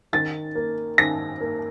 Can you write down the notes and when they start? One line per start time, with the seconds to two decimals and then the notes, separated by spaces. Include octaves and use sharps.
0.13 D#3 A6
0.55 A#3
0.98 D#3 A#6
1.41 A#3